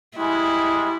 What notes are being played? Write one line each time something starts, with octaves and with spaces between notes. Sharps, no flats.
G3 G#3 E4